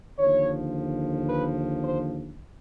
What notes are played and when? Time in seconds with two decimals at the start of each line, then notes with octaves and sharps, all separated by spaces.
0.19 D#2 D3 F3 C#5
1.29 B4
1.83 C5